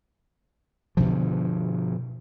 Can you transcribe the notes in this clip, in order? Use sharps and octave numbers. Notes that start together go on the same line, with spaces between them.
G2 B2 D3 F3